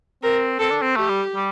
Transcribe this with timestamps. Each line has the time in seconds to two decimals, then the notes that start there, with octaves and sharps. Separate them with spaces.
0.23 C4 A#4
0.59 C4 A4
0.70 D4
0.82 C4
0.96 A3 G4
1.08 G3
1.35 G3